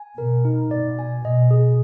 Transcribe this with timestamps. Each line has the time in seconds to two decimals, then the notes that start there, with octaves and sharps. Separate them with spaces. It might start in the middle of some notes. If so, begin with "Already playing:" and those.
Already playing: G#5
0.18 B2 A#4
0.45 D#4
0.71 B2 D5
0.99 G#5
1.24 B2 D#5
1.51 G#4